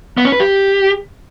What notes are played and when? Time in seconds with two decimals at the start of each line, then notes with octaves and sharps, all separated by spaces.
0.18 B3
0.25 C#4
0.32 B4
0.40 G4